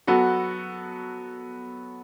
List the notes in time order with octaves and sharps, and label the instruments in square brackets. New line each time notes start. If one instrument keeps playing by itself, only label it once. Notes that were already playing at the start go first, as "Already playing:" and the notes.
[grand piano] F#3 B3 F#4 A4